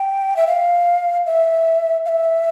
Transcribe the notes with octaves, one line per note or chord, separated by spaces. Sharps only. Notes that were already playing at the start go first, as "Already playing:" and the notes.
Already playing: G5
E5
F5
E5
F5
E5